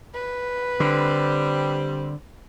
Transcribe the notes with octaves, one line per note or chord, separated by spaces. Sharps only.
B4
D3 G3 C4